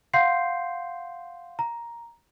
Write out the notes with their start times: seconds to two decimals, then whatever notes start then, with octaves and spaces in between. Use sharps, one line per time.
0.14 F5 F#5 C6 G6 C7
1.59 A#5